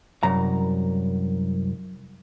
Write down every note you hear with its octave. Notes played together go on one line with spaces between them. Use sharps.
C2 F#2 A#5